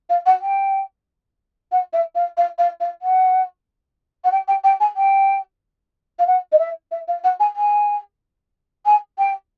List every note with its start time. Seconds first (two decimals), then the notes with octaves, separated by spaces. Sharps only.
0.09 F5
0.26 F#5
0.41 G5
1.72 F#5
1.93 E5
2.15 F5
2.37 F5
2.58 F5
2.80 F5
3.02 F#5
4.24 F#5
4.31 G5
4.48 G5
4.64 G5
4.80 G#5
4.96 G5
6.19 F5
6.27 F#5
6.52 D#5
6.59 E5
6.91 E5
7.08 F5
7.24 F#5
7.40 G#5
7.56 G#5
8.85 G#5
9.18 G5